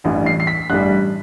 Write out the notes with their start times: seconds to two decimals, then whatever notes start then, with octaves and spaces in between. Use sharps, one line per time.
0.04 A1 G2 E3 G3
0.26 C7
0.40 C7
0.47 B6
0.70 A1 G2 E3 G3 F#6